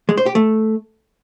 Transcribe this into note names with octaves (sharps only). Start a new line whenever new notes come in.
G#3
C5
G4
A3